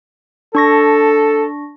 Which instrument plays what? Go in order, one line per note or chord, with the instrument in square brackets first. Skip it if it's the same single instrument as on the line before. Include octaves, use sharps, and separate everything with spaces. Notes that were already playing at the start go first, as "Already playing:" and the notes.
[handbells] D4 C#6 A#6 [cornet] A4